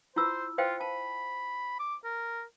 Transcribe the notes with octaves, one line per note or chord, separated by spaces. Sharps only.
E4 F4 C5 E6
F4 C5 F5 G5
A5 B5
D6
A#4